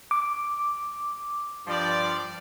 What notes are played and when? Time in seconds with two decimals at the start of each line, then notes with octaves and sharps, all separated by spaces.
0.11 D6
1.67 G2 F3 D5